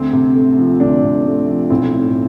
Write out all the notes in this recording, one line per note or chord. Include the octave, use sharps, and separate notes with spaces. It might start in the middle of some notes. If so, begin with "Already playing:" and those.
Already playing: D2 C4
C3
A3
F3
D2 D4
C3
A3
F3
B1 C4 E4
A2